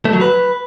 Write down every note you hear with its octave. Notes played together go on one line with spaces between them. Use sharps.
A3
F#3
B4